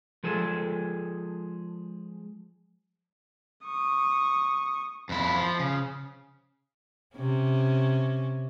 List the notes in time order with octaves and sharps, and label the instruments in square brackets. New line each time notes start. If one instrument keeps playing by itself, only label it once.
[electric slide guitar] F3 G#3 G#4 A4
[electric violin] C#6 D#6
[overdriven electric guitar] F2 E4
F3
C#3
[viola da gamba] C3 C#4